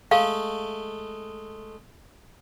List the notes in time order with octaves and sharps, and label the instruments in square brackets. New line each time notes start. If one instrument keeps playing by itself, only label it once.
[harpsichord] G#3 A3 [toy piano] F5